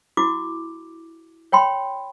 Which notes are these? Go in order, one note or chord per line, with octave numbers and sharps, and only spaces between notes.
E4 F#4 D6
C#5 G5 B5 C6